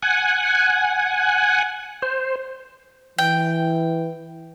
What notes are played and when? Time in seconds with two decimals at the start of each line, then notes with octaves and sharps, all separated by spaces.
0.03 F#5 G#5
2.02 C5
3.18 E3 G5